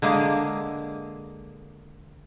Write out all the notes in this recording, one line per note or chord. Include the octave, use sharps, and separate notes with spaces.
D3 G#3 A#3 G#4